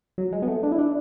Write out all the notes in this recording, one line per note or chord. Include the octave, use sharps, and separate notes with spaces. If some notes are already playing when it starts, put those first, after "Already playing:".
F#3
G#3
B3
A3
D4
E4
D4